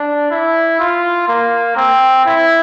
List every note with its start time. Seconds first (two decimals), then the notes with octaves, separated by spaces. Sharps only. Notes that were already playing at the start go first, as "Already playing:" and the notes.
Already playing: D4
0.31 E4
0.79 F4
1.28 A#3
1.76 C4
2.25 E4